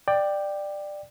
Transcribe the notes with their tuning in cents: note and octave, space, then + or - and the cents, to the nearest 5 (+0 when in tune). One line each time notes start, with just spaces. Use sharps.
D5 +15 G5 +0